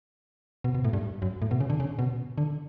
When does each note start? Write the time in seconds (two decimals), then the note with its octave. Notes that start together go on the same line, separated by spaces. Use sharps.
0.64 B2
0.75 B2
0.84 A2
0.93 G2
1.22 F#2
1.42 A2
1.51 B2
1.61 C#3
1.70 D3
1.80 C#3
1.99 B2
2.38 D3